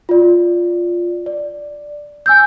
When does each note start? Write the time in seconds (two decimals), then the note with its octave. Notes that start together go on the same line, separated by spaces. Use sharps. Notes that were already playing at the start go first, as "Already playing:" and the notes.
0.09 F4 D5
1.26 D5
2.26 G#5 E6 G6